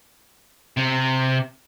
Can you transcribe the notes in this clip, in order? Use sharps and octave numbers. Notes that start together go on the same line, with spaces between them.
C3